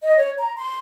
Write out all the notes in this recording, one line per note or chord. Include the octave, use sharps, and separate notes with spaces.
D#5
C#5
A#5
C6